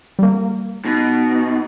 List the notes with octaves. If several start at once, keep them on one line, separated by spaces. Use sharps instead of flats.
G3 A#3
B2 D#4